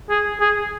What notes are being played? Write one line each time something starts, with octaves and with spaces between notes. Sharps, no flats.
G#4
G#4